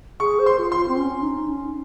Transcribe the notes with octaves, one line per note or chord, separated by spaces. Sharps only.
G#4 C#6
C5
C6
F4
C6
F4
C4
C#4
D#4
C#4